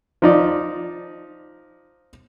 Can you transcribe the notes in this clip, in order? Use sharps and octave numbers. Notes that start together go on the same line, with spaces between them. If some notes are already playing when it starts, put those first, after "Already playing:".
F3 D#4 D5